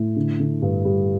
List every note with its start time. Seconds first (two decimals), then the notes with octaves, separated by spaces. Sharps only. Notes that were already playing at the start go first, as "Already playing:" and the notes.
Already playing: A2
0.16 D3
0.40 D3
0.62 G2
0.85 G3